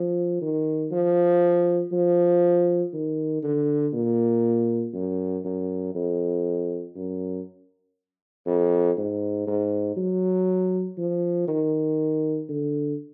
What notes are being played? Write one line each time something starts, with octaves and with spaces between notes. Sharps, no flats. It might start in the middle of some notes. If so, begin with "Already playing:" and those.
Already playing: F3
D#3
F3
F3
D#3
D3
A#2
F#2
F#2
F2
F#2
F2
G#2
G#2
F#3
F3
D#3
D3